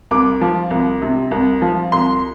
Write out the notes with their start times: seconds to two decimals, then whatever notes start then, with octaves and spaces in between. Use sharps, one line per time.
0.11 C2 D6
0.41 F3
0.71 C2
1.02 C3
1.31 C2
1.62 F3
1.92 C2 C6